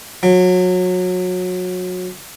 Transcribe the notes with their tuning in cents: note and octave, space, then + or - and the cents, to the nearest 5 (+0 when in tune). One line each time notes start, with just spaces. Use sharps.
F#3 -25